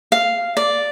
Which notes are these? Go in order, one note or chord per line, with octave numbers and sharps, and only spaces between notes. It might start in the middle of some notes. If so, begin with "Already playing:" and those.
F5
D5